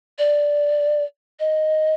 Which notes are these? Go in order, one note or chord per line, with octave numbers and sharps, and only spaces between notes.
D5
D#5